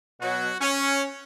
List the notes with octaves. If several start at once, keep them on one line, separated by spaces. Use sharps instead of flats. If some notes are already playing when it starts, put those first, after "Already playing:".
B2 F#3 F#4
C#4